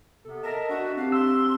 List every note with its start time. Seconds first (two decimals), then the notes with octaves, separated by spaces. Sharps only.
0.25 C3 B3 A4
0.43 A#4 D#5 E5 A5
0.69 D4 F#4
0.97 C4 D4 G4 F5
1.12 C6 E6